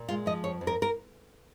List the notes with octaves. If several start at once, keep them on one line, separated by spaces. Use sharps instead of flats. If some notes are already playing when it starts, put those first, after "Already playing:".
Already playing: A#2
G#3 F4
F3 D#5
F2 C#5
F2
A#4
A#4